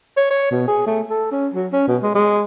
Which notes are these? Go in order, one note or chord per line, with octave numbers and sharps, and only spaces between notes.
C#5
C#5
B2
G#4
A3
A4
C#4
F#3
C#4
B2
G#3
G#3